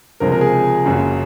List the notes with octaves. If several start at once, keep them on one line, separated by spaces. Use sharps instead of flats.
C#2 C3 F3 G#3 A#4
A#4
G#4
F#1 F#2 C#3